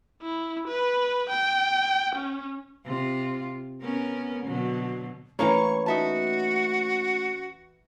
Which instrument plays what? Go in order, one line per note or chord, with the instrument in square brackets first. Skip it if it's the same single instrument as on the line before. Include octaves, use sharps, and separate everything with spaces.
[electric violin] E4
B4
G5
C#4
[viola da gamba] C3 F4
B3 C#4 A#4
B2 D3 F#3
[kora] E3 A#3 [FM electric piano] A3 C#4 [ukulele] C#5 F5 A#5 [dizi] C#6
[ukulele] D#4 E5 A5 [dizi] F#4